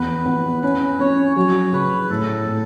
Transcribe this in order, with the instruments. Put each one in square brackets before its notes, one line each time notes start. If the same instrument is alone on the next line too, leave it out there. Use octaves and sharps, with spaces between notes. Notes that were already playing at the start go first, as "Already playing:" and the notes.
Already playing: [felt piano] E2 B3 [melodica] B4
[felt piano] B3
[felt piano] C#4 [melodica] B4
[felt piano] C#4 [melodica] C#5
[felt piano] F#3 [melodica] C#5
[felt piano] C#3 [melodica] B4
[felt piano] A2 [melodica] A4
[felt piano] A2